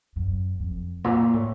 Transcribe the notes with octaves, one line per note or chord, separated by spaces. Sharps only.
F#2
F2
A#2
A2